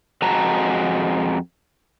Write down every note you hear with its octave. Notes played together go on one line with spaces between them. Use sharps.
F2 G#3 F#4 A5 A#5